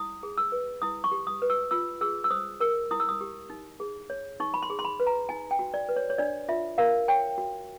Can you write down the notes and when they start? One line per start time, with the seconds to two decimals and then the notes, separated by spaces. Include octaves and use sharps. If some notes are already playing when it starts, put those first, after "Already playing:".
Already playing: E4 D#6
0.23 G#4
0.38 E6
0.52 B4
0.82 E4 D#6
1.04 C#6
1.12 G4
1.27 D#6
1.42 B4
1.50 E6
1.71 F4 E6
2.01 G#4 E6
2.24 E6
2.30 C5 D#6
2.60 A#4 E6
2.91 E4 D#6
3.00 E6
3.09 D#6
3.21 G4
3.50 D#4
3.80 G#4
4.10 C#5
4.40 D#4 C#6
4.54 B5
4.62 C6
4.70 G#4
4.79 C6
4.85 B5
5.00 B4
5.07 A#5
5.29 D#4 G#5
5.51 G5
5.59 F#4
5.74 D5
5.89 B4
5.96 C#5
6.10 C#5
6.18 D4 D5
6.49 F4 E5
6.78 A#4 F5
7.08 C#5 G5
7.38 F#4